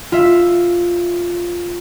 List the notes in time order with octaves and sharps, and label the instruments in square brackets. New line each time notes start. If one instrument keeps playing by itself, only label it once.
[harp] F4 E5